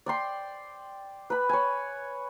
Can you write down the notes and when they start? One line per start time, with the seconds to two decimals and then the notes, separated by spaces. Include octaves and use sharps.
0.06 D5 G5 C6
1.30 B4 B5
1.49 C#5 G#5